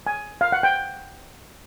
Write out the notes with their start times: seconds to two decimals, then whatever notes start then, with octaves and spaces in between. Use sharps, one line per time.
0.07 G#5
0.41 F5
0.52 F#5
0.63 G5